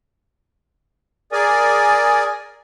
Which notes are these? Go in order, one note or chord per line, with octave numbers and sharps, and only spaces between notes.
G#4 A#4 D5 G#5